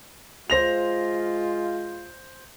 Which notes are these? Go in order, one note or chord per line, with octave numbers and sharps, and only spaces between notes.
G#3 F4 C5 A#6 F7